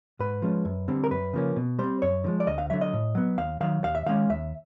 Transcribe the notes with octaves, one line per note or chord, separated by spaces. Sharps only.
G#2 B4
F3 G#3 C#4
F#2
D3 G3 C4
A#4
F#2 B4
C#3 F3 A#3 C#4
B2
G3 C4 C5
F#2 C#5
D3 F3 G#3
D5
D2 D#5
F5
D3 F#3 E5
D#5
A2
F#3 B3
D#2 F5
D#3 F#3 F5
D#2 F5
E5
D#3 G#3 C#4 F5
D#2 E5